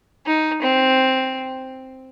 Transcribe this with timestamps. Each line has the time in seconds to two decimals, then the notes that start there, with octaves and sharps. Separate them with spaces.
0.27 D#4
0.62 C4